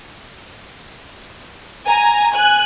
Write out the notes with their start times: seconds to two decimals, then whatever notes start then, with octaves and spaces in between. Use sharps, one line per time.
1.86 G#5 A#5
2.32 G#5 F#6